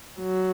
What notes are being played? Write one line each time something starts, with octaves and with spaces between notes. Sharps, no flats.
F#3